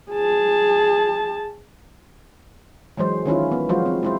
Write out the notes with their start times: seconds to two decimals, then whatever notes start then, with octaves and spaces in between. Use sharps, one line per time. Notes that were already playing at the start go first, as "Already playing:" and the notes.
0.11 G#4 A5
2.97 E3 F#3 G#3 C5
3.26 D#3 C#4 E4 F4
3.52 B3
3.69 F3 F#3 G#3 F4 F#4 C5
3.86 C4
4.03 G#3 E4 C5